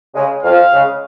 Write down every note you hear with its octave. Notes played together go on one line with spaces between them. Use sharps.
C#3 G#3
F2 F5
C#3 G#3